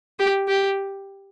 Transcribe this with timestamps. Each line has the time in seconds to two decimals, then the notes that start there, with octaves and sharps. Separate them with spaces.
0.19 G4
0.48 G4